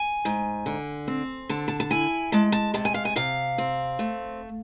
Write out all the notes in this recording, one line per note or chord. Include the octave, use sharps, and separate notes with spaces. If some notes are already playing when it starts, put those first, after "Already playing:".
Already playing: G#5
G#2
D3
C4
D3 A5
A5
A5
E4 G#5
G#3 A5
A5
C3 A5
G#5
F5
G#5
C3 F5
C4
A3